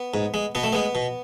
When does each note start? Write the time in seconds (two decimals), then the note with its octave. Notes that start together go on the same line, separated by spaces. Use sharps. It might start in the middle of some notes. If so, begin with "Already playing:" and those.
Already playing: B3
0.14 G#2
0.34 G#3
0.55 B2 B3
0.64 A3
0.73 G#3 B3
0.95 B2